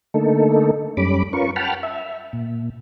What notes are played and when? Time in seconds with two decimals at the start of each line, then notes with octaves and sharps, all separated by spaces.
0.14 D3 A3 A#3 D#4 A4
0.97 F#2 G3 C#4 B5 D6
1.33 C#4 F4 A#4 B4 C#6
1.56 F#5 G5 A5 B5 F6
1.83 E5
2.33 A#2